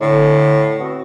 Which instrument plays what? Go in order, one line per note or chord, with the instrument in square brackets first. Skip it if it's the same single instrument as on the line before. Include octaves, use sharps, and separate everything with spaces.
[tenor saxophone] A2 [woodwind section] D3
[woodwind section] B3 C4 F#4